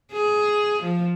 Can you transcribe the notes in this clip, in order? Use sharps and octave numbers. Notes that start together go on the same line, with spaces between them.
G#4
F3